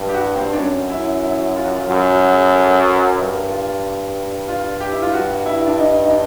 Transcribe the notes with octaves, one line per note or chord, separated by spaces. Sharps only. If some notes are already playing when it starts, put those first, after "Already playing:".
Already playing: G2
G4
F#4
C4
D4
F#2 C#4
E4
E4
F4
F#4
F4
F#2 F4
F#4
G#4
A#4
A4
B4
G2 A#4
F4
F4
G4
E4
F4
G2 F#4
E4
D4
D#4
D#4
D4